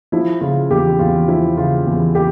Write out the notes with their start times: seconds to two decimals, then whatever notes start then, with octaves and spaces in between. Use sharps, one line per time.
0.12 F3 E4
0.41 C#3 F4
0.70 E2 G4
0.99 E2 F4
1.28 F3 E4
1.57 C#3 F4
1.86 E2
2.15 G4